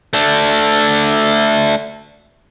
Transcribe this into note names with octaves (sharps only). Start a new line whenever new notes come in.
A3 D4